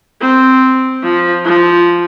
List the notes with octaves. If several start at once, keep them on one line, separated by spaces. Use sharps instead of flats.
C4
F3
F3